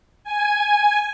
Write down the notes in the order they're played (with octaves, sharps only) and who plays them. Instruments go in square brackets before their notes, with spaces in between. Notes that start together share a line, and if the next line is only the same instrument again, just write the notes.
[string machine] G#5